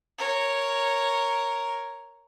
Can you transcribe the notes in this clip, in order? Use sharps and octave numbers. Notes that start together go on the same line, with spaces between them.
A#4 C#5